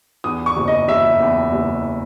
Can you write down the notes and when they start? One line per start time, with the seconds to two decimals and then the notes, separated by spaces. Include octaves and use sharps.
0.24 E2 D#6
0.46 C#6
0.57 F#1
0.68 D#5
0.88 F#1 E5
1.20 E2
1.52 F#1